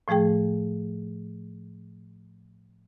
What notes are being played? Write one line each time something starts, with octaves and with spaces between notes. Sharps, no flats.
A2 F3 A3 G#4 G5